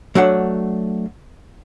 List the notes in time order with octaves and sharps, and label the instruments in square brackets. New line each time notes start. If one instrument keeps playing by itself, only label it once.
[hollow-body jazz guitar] F#3 A3 D4 F#5